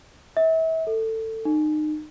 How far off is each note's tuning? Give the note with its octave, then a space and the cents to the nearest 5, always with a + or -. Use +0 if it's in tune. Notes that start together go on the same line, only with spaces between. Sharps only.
E5 -35
A4 +20
D#4 -30